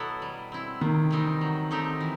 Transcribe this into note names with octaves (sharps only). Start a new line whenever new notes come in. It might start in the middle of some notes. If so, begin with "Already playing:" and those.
Already playing: B2 F#3 B3 E4 A4
G3
C4 E4
C3 D#3
E3 G3 C4 D#4
F#3
A3 C4 D#4 G4
E3